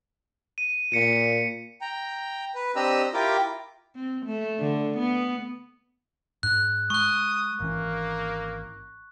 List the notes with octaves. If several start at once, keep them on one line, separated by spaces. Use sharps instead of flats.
D#7
A#2 B6 C#7 D#7
G5 A#5
B4
C4 D4 G4 D#5 A#5 E6
E4 F4 G4 A#4 G5 D6
C4
A3
D3
B3
G#2 F#6
G#3 C#6 D#6 F#6
G#1 E3 A#3 C#4